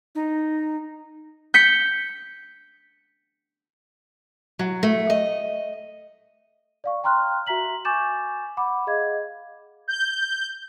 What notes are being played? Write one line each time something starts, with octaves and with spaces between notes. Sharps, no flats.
D#4
G6 B6 C#7
F#3
A3
D#5
D5 F5 C#6
G5 A#5 C6 F6 F#6
F#4 E5 A#5 B6 F#7
G#5 C#6 D6 G6 A6 E7
F#5 B5 D6
G#4 D#5 F5 G#6
G6